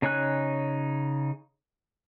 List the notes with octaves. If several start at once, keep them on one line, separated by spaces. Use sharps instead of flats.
C#3 D#4 C#5 G#5 F#6